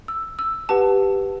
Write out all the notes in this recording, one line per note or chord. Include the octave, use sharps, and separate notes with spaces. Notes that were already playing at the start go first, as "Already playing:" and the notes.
E6
E6
G4 B4 F#5 A5